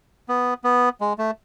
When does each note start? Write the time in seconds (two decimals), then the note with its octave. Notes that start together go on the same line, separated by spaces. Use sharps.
0.29 B3
0.64 B3
1.01 G#3
1.18 A3